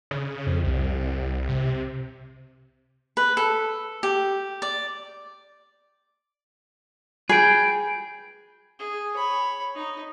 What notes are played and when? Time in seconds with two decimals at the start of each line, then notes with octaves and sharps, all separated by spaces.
0.11 C#3
0.47 F2
0.64 C2
1.49 C3
3.17 B4
3.37 A4
4.03 G4
4.62 D5
7.29 G#4 B4 G5
8.79 G#4
9.16 C#5 B5
9.75 D#4